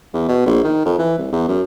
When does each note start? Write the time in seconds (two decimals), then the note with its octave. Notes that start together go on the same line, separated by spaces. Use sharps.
0.14 E2
0.28 B2
0.46 A#1
0.64 D#3
0.85 F2
0.99 E3
1.18 C2
1.32 E2
1.48 F#2